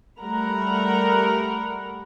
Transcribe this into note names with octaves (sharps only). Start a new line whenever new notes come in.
G3 A3 A#4 F#5 A#5 B5